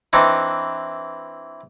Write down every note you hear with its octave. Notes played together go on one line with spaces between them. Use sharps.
E3 C4 D4 D#4